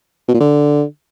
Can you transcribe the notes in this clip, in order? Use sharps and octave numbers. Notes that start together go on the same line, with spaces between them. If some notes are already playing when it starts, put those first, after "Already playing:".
B2
A#2
D3